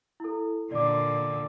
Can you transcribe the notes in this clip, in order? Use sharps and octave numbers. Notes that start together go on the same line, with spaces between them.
E4 A4
A#2 D3 D5 D6